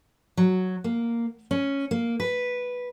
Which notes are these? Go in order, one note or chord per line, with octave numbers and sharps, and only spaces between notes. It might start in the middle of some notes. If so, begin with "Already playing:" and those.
F#3
A#3
C#4
A#3
B4